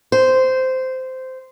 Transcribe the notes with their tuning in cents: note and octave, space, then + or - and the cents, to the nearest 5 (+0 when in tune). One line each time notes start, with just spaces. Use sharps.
C5 -15